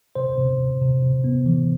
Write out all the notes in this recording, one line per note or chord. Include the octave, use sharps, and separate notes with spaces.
C3 C5
C3
C3
C3
C3
B3
E3